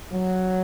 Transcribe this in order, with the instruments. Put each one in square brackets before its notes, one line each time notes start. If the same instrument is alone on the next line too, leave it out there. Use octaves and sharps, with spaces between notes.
[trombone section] F#3